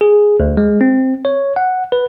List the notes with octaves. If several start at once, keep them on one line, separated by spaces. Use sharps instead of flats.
G#4
D2
G#3
C4
C#5
F#5
B4